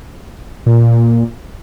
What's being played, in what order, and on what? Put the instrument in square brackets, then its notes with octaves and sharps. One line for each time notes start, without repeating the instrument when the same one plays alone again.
[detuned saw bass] A#2